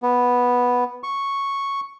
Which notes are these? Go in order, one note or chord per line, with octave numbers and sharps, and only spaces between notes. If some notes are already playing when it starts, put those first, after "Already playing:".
B3
C#6